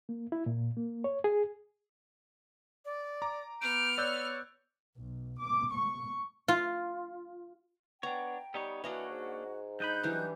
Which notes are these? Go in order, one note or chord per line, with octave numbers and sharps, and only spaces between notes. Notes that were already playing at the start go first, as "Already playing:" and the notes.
A#3
E4
A#2
A#3
C#5
G#4
D5
A#5 D6
B3 F6 G6 D7
C#5 D5 E6 F#6 G6
B1
D6
C#6
F4
B3 D4 C#5 G5 A#5
G3 B3 D#4 C#5
E3 A#3 D4 F#4 C#5 D#5 F#5
G#2
G2 D#4 D#5 B5 F#6 G6
E3 F#3 G3 D4